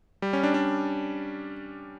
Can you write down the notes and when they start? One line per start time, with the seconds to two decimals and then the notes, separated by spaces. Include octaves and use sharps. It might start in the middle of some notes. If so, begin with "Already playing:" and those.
0.22 G3
0.33 C#4
0.43 D4
0.54 D4